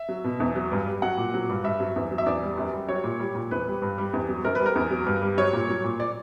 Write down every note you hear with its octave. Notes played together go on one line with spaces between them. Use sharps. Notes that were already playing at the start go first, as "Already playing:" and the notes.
Already playing: E5
F#3
B2
E2
F#3
G2
G3
F#3 F#5
A#2
F#3
G2
G2 E5
F#3
E2
F#3
E5
E2 D5
G3
F#2
G3
F#3 C#5
A#2
G3
A#2
E2 B4
G3
G2
G3
E2
F#3
F#2 A#4
G3 B4
A#4
E2
F#3
G2
G3
F#3 C#5
A#2
F#3
A#2
D5